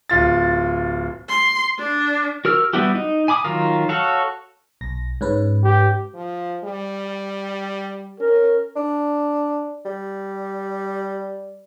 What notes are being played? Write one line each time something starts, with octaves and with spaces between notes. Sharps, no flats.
D1 F4 A6
C6
D4
F#4 A#4 E6 F6
G3 B3 E4 F#4 G4
D#4
G#5 B5 D6 D#6
D#3 F#3 F4 A#4
F#4 A4 C#5 F5
B1 A#6
G#2 C#4 B4
G4
F3
G3
C#4 A#4
D4
G3